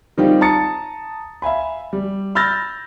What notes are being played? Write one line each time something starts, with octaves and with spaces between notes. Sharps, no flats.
D#3 G3 C4 D#4 F4 G4
A5 A#5 D#6 A6 C#7
E5 F5 G#5 B5
G3
B5 E6 F6 G6 A6 A#6